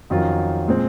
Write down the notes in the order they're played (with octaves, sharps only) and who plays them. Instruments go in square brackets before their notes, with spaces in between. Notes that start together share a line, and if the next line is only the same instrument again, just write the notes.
[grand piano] F2 D#3 F#3 C#4 F4
A#2 G#3 C4